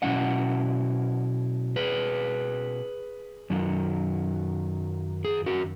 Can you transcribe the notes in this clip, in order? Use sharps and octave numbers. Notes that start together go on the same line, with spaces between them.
B2 F#3 C#4 E4 D#5 F#5
G#4 B4
F#2 D#3 F#3
G#4
F#4 A#4